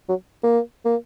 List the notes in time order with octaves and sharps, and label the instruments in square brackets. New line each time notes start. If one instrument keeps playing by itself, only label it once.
[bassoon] F#3
A#3
A#3